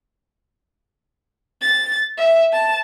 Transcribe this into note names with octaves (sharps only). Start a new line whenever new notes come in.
A6
E5
A5